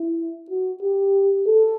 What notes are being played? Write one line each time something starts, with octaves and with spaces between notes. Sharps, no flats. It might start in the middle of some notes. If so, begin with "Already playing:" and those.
Already playing: E4
F#4
G4
A4